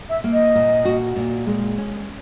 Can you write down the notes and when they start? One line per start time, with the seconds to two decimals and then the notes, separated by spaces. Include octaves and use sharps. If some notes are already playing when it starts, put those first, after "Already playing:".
0.09 E5
0.24 A#3
0.32 D#5
0.55 A#2
0.85 F#4
1.16 A#2
1.46 G#3
1.78 C#4